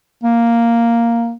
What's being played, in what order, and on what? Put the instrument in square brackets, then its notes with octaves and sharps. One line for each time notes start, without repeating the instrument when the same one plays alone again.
[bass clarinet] A#3